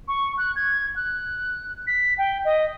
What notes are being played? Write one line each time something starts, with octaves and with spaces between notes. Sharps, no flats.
C#6
F#6
G#6
F#6
B6
G5
D#5